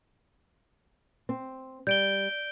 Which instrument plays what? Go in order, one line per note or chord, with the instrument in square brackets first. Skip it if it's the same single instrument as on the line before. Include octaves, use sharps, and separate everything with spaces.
[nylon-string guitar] C4
[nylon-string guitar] G3 [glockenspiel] G6 D7 G7